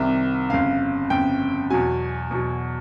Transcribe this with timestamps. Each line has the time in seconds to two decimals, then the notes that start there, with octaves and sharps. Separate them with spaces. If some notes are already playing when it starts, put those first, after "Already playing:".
Already playing: C2 C3 D#3 E5
0.50 G1 F2 C#3 F5
1.10 G1 F2 C#3 G5
1.70 E2 B2 F#3 G#5
2.31 E2 B2 F#3